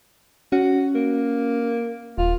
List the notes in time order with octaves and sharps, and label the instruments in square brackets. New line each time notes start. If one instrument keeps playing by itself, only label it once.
[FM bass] C#4 [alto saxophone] F#4
[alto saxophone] A#3
[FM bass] D#1 [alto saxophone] F4